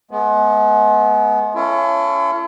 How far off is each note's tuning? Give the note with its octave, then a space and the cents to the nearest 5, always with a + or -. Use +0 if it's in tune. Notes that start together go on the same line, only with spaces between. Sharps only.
G#3 +40 B3 +0
C#4 +0 E4 +45 A4 +0